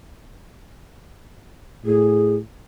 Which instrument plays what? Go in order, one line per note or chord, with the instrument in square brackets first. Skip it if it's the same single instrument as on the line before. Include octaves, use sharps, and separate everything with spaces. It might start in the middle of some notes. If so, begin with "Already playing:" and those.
[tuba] A2 [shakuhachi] G#4